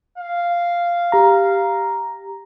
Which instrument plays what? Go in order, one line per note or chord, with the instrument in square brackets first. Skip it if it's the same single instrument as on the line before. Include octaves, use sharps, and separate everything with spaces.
[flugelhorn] F5
[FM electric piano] G4 A#5